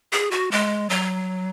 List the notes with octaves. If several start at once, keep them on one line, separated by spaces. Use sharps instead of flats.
G#4
F#4
G#3
F#3